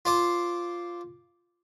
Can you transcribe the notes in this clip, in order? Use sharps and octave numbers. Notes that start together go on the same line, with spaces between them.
F4 C5 D6